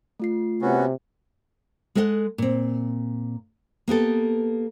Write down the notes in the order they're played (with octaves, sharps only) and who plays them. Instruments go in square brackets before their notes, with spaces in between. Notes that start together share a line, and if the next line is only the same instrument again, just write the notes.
[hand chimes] A3 F4 C7
[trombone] C3 [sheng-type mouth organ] B3 C#4 F#4
[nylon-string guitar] G#3 A4 D#5 E5 F#5
A#2 C4
A#3 B3 G4 A4